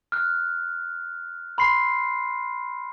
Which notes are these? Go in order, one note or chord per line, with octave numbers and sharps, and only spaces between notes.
F6 F#6
B5 C6 C7